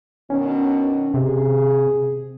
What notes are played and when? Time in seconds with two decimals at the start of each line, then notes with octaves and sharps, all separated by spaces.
0.30 B2 D#3 C#4 D4
1.14 C3 G#4